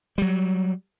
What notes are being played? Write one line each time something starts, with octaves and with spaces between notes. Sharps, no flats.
F#3 G3